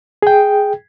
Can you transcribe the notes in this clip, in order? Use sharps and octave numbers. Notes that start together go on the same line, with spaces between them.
G#4 G5